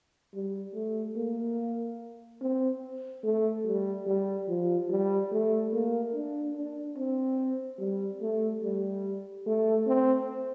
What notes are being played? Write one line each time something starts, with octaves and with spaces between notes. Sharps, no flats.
G3
A3
A#3
C4
A3
G3
G3
F3
G3
A3
A#3
D4
D4
C4
G3
A3
G3
A3
C4